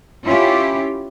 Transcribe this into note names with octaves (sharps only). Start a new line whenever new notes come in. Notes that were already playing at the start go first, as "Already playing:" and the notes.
C#4 E4 F4 G4